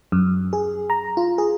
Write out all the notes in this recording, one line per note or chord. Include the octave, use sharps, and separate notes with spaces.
F#2
G#4
A#5
F4
G#4